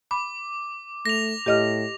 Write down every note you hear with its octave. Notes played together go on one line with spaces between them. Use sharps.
B5 D6
A3 A#6 F7
A2 G4 D#5 F6